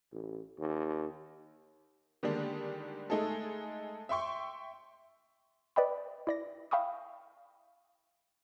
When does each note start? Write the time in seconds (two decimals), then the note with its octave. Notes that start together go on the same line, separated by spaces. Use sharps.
0.12 A1
0.59 D#2
2.23 D3 D#3 G3 G#3 A#3 D4
3.10 G#3 A3 D#4 G#4 A4
4.09 E5 G5 C6 C#6
5.76 B4 D5 D#5 G5 B5
6.27 E4 D5 A#6
6.71 E5 F5 G5 B5 C#6 D#6